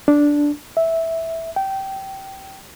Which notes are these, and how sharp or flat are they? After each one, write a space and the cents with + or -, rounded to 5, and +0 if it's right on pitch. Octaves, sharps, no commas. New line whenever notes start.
D4 -5
E5 -10
G5 -20